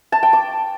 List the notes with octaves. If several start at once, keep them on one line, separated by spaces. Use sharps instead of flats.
A5
G5
D6